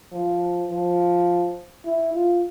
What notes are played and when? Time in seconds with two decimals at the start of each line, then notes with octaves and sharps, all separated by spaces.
0.12 F3
0.70 F3
1.85 E4
2.14 F4